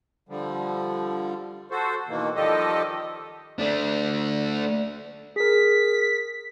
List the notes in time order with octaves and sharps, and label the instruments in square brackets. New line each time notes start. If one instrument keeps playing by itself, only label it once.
[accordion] D3 F3 G3
F#4 A4 C5
B2 D#3 E3 A#3
D#3 F3 G3 G4 A4 D#5
[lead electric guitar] A3 D4
[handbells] G#4 A#4 [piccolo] B6